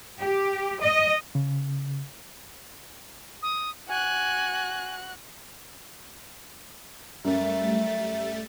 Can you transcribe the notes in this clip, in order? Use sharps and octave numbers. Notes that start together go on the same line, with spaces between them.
G4
D#5
C#3
D#6
F#4 G#5 F#6
F#2 G3 A3 E5 A6